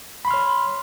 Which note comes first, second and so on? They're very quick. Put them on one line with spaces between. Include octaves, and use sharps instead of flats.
B5 C6 F6 C#5